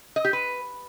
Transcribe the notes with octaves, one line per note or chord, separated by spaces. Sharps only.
D#5
G4
B4